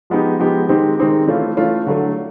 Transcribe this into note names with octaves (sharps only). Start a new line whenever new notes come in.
F3 G#3 B3 D#4 G4
F3 G#3 B3 D#4 G4
D#3 G#3 C4 D#4 G4
D#3 G#3 C4 D#4 G4
E3 A3 C#4 F4
E3 A3 C#4 F4
D3 F#3 A3